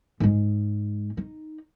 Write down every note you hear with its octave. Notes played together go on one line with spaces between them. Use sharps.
G#2 G#3
D#4